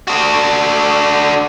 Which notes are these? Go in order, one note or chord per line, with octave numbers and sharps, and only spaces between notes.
D4 F#4